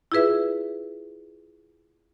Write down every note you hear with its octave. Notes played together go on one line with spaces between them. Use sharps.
E4 F4 G#4 B4 E5